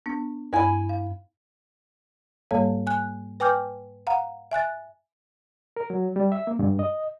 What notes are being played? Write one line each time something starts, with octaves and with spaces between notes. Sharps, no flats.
B3 D4
G2 E4 G#5 B5
F5
G#2 G3 A#3 A4 C#5 F5
G#5 F#6
B4 G5 G#5 D6 F6 G6
F5 F#5 A#5
E5 G#5 F#6 A6
A#4
F#3
G3
E5
A#3
G2
D#5